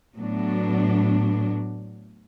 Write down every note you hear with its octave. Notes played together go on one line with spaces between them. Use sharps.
A2 F#3 B3 D4